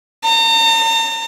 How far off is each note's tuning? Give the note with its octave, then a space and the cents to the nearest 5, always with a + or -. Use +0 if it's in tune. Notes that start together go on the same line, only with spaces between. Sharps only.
A#5 -45